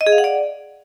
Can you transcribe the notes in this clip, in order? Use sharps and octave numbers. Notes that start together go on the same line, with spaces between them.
D#5
G#4
F5
F#5
D5